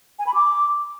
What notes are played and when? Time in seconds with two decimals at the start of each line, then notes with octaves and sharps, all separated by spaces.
0.19 G#5
0.27 B5
0.34 D6